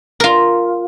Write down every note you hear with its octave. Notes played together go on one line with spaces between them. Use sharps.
F4 A#4